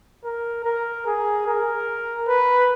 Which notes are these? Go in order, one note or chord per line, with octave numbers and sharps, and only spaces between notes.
A#4
A#4
G#4
A#4
B4